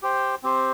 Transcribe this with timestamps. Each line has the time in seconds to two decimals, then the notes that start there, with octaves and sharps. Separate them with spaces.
0.03 G4 C5 G5
0.43 C4 G4 C5